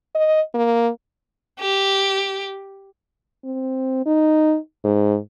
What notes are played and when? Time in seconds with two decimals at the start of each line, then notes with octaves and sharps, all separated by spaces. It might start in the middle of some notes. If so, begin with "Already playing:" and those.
0.15 D#5
0.54 A#3
1.60 G4
3.44 C4
4.06 D#4
4.84 G#2